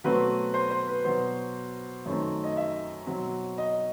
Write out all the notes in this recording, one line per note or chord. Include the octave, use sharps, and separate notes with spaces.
B2 F#3 A3 C4 B4
C5
C5
B4
B2 F#3 B3 C5
F#2 D#3 A3 C4
D#5
E5
B2 F#3 C4
D#5